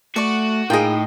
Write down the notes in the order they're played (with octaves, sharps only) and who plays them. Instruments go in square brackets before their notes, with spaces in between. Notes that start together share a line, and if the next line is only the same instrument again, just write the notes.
[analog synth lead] A3 [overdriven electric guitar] F#4 [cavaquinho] D5 C#6
[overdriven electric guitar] A2 [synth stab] A#3 F4 G#4 [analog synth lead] D#4 [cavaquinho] D#5 G5